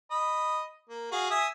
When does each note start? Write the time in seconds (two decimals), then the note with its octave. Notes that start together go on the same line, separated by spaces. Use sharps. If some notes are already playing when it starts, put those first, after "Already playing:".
0.11 D#5 B5
0.90 A#3
1.12 F#4 G#4 F5
1.31 E5 G#5 D#6